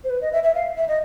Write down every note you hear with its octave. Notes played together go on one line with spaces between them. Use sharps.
C5
B4
D#5
E5
E5
F5
E5
D#5